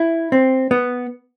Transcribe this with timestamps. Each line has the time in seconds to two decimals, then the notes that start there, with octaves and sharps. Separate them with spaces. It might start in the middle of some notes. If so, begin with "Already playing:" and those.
Already playing: E4
0.32 C4
0.71 B3